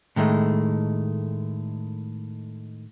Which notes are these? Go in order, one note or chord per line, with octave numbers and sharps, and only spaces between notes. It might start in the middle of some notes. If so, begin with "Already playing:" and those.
A2 D#3 G#3 A3